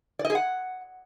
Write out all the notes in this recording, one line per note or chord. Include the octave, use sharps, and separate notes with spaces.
D5
D#5
G#4
F#5